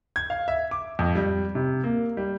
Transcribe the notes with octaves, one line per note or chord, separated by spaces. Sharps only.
G#6
F5
E5
D6
F2
G3
C3
A#3
G3